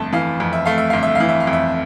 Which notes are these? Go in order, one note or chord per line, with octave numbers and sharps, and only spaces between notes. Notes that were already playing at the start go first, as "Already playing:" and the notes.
Already playing: G1 F2 A3 A5
E3 F5
F2
E5
A3 F5
E5
G1 F5
E5
F5
E3
E5
F5
F2
E5